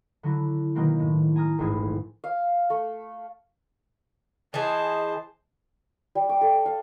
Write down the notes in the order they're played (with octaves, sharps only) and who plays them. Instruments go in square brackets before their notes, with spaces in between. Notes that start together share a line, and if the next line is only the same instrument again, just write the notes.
[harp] D3 F#3 E4
B2 D#3 F#3 A#3 C4
A2
G#5 A#5 D#6 F6
D#1 A1 G#2 E4 G#4
[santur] F5
A3
[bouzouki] E3 G#4 [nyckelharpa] C5 A5 [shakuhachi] D#5
[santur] G3
D6
A4
F5